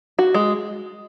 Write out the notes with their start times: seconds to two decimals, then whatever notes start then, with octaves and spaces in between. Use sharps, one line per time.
0.19 F#4
0.34 G#3